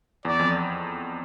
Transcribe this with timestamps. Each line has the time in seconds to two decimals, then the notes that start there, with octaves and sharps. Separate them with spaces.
0.25 E2 D5
0.39 F2